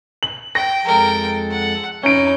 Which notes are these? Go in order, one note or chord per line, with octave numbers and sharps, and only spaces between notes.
F#7
G5 A#6
F2 G#3 A4 A#4 G5
F#5
F2 C#4 D#4 E4 G6 D7